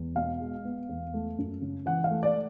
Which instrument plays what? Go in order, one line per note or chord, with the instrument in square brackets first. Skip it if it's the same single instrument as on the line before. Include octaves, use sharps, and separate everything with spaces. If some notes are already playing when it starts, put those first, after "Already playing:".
Already playing: [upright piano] E2
B2 F5
G#3
B3
E2
A3
F#2
C#3
E3 F#5
F5
A3
D5